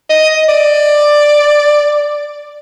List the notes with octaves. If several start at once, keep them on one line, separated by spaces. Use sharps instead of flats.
D#5
D5